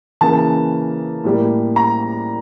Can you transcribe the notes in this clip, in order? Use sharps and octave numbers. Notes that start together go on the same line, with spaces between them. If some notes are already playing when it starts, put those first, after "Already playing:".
C#3 E3 A#3 A5
A2 G3 A#3
A#5